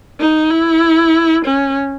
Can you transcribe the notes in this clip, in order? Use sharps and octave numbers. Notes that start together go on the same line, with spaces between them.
D#4
E4
C#4